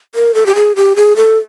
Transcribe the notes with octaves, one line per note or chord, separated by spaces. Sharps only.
A#4
A4
G4
G#4
G4
G#4
A4